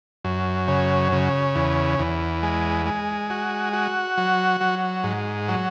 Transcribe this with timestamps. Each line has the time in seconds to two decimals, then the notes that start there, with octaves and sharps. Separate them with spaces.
0.25 F#2
0.68 C#3
1.12 C#3
1.55 E2
1.99 E2
2.43 G#3
2.86 G#3
3.30 F#4
3.73 F#4
4.18 F#3
4.61 F#3
5.04 G#2
5.48 F#3